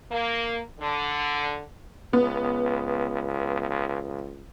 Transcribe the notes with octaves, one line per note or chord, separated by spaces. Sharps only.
A#3
D3
C#2 B3